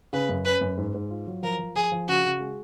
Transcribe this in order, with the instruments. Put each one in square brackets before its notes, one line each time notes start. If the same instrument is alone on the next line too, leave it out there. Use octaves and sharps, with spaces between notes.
[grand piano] C#3 [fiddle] B4
[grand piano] F#2
[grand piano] C#4 [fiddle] B4
[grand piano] F#2
G#2
G#2
F4
F#3
[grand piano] F3 [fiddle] A#4
[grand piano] F3
[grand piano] F3 [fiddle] G#4
[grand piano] F3
[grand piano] C#3 [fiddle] F#4
[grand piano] C#3
G#3